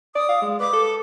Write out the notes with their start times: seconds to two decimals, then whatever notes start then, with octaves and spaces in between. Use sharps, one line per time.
0.16 D5 D#6
0.29 F5
0.42 G#3
0.60 B4 D6
0.73 A4